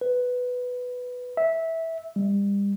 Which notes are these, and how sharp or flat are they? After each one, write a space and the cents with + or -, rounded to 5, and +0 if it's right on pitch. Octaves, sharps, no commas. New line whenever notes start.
B4 +5
E5 -15
G3 +35